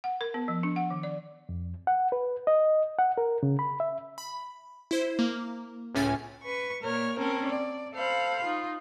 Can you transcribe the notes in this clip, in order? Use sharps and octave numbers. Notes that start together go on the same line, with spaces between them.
F#5
A#4
B3
F3
D4
F#5
D#3
D5
F2
F#5
B4
D#5
F#5
A#4
C#3
B5
E5
B5
E4 C5
A#3
C#2 A2 C#4 G#5 A6
B4 C#6
A#2 A#4 C#5 F6
C4 C#4 A4 A#4
D5
A4 C5 F5 B5
D#4 F4